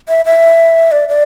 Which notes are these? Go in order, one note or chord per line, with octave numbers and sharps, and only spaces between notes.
E5
E5
D5
D5